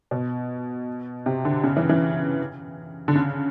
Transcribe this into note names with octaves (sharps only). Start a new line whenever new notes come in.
B2
C3
D3
C#3
E3
E3
D3
C#3